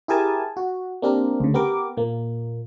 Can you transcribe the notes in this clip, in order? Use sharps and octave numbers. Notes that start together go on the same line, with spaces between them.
E4 G4 G#4 A#4 G#5 A5
F#4
A#3 C4 D4 G4 A#4
D2 C#3
B3 G4 A#4 D6
A#2 A#3